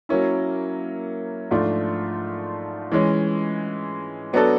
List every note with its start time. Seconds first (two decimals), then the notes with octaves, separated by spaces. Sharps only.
0.09 F#3 A#3 C#4 E4
1.51 G#2 F3 A3 D4 F4
2.92 E3 G#3 C#4
4.33 F#3 B3 D4 F#4 A4